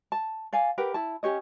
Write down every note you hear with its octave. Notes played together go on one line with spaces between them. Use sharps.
A5
D5 F5 G#5
G4 A#4 B4 F#5
E4 A5
C#4 G4 C#5 D#5